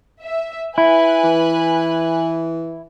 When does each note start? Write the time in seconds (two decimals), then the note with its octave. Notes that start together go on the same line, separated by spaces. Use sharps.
0.22 E5
0.78 E4 B4 G#5 F#6
1.23 E3